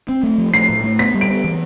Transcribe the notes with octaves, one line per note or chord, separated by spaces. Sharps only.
C4
A3
F3
A3 C7
A2
A3
B3 B6
G3
D7
B3
E3